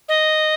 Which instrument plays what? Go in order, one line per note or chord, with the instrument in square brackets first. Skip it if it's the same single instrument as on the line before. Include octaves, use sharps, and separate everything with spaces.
[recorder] D#5